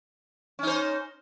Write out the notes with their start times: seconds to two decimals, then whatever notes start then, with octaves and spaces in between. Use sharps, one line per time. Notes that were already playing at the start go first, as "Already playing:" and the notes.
0.59 C#4
0.63 D#4
0.67 C5